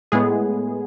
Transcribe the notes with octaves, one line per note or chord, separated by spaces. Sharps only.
A2 G#3 B3 G#4